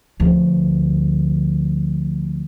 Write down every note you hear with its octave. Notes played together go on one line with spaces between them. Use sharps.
D2 F3